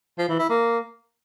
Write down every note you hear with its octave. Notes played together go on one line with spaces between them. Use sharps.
F3
E3
E4
A#3